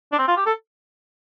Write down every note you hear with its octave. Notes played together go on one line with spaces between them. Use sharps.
D4
C4
F4
G4
A4